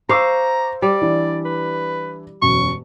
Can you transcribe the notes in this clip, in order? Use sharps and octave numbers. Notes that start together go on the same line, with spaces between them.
C5 F5 A#5 C#6 D6 E6
G3 D5
E3 D4 E4
B4
E1 F#2 C#6